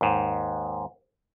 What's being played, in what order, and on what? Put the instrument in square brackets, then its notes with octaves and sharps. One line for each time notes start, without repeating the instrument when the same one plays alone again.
[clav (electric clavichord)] D#2 G#2